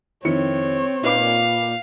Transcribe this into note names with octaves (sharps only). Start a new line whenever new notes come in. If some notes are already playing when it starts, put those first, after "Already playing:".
F2 D#3 C4 E4 C#5 C#7
A#2 D#4 B4 F5 D6